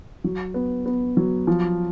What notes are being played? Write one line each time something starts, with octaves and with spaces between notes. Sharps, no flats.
F#3
B3
B3
F#3
F3